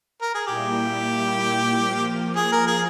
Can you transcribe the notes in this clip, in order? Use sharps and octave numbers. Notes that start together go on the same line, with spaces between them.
A#4
G#4
A#2 G3 A#3 E4 G4
F3 A#3 F4
G#4
A#4
G#4